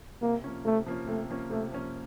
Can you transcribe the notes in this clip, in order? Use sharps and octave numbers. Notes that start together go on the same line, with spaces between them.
C3 A#3
F3 A#3 C#4
C3 A3
F3 A#3 C#4
C3 A3
F3 A#3 C#4
C3 A3
F3 A#3 C#4